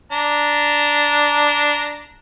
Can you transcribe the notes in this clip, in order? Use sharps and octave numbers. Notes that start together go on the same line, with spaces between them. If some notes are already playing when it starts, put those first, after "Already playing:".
D4 A#5